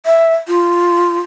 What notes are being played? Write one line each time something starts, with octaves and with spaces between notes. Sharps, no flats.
E5
F4